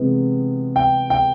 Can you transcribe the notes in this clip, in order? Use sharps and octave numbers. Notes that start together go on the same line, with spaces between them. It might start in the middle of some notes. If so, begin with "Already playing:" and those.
Already playing: C3 E3 G#3 B3
G5
G5